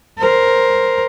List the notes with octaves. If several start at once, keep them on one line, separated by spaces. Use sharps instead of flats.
A#4 C5